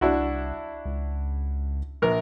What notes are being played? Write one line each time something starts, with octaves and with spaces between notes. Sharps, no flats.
C2 D4 E4 F#4
C#2
A#1 A#4